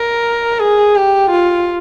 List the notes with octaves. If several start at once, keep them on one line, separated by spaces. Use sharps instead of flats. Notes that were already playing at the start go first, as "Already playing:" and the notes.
Already playing: A#4
G#4
G4
F4